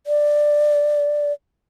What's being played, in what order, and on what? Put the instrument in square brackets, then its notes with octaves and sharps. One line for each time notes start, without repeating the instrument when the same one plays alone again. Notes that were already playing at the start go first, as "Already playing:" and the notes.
[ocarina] D5